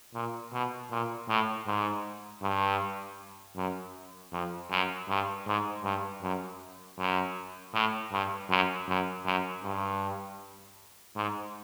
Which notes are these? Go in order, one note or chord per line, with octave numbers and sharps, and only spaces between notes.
A#2
B2
A#2
A2
G#2
G2
F#2
F2
F#2
G2
G#2
G2
F#2
F#2
A2
G2
F#2
F#2
F#2
G2
G#2